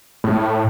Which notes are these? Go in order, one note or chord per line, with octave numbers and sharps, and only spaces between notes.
A2